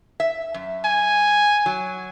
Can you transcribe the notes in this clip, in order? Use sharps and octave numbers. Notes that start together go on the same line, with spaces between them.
E5
F#2
G#5
F#3